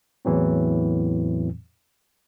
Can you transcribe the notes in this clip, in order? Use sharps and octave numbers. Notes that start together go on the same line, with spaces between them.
E2 A2 E3 F#3 C4